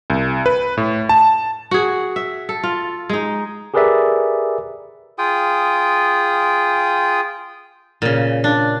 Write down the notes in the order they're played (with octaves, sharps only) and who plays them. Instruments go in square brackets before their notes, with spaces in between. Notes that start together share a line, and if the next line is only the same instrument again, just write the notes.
[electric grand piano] C2
B4
A2
A5
[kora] F#4 G#4
E5
A4
F4
G#3 D#4
[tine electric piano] G4 G#4 A#4 B4 D5 E5
[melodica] F4 G#4 G5 D#6
[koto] A#2 C#3
D4